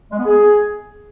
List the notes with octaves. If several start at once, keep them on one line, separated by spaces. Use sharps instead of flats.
G#3
B3
G#4